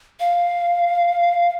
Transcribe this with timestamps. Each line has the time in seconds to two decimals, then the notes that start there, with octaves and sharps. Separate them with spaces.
0.20 F5